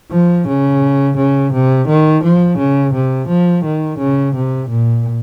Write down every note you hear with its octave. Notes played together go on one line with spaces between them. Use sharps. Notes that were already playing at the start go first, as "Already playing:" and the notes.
F3
C#3
C#3
C3
D#3
F3
C#3
C3
F3
D#3
C#3
C3
A#2